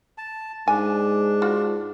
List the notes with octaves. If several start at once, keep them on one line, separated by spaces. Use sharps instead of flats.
A5
G#2 D4 G#5
F4 F#4